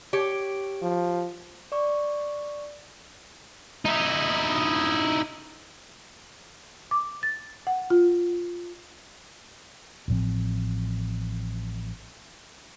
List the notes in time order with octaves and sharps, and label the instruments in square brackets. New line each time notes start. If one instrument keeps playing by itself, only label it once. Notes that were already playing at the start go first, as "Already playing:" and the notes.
[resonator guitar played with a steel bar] G4 C#5
[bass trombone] F3
[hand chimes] D5 C#6
[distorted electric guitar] D#4 E4
[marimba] D6
A6
F#5
F4
[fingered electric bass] A1 A2 F3 C4